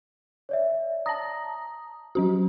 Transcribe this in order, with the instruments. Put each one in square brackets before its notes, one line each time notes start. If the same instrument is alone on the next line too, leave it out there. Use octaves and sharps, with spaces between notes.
[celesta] C#5 D5 E5
[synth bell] A5 D#6 [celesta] A#5 A#6
[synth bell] F#3 C#4 F#4